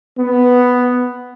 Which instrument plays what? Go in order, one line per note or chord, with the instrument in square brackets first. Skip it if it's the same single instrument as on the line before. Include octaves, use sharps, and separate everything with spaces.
[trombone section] B3